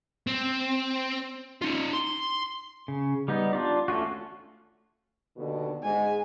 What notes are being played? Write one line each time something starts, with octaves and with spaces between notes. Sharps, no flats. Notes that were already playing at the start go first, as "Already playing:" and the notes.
C4
D#4 F4
C6
C#3
G3 B3 D#4
D4 F4 D5
A3 C#4 F4 F#4
D#2 B2 D3
G#2 G#3 G#5